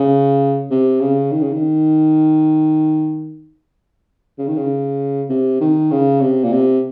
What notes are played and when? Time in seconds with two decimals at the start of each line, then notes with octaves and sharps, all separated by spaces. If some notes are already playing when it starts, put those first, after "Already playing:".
Already playing: C#3
0.71 C3
1.01 C#3
1.31 D#3
1.42 C#3
1.52 D#3
4.38 C#3
4.48 D#3
4.57 C#3
5.29 C3
5.61 D#3
5.91 C#3
6.21 C3
6.44 A#2
6.52 C3